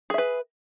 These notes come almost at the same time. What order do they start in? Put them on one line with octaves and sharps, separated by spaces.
G#4 E5 B4